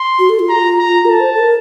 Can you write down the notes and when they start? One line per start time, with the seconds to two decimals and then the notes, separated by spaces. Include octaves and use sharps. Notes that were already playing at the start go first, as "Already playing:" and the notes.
Already playing: C6
0.19 F#4
0.30 A4
0.39 F4
0.49 A#5
0.79 A#5
1.05 A#4
1.09 A4 A5
1.20 C5
1.34 A4
1.40 A#4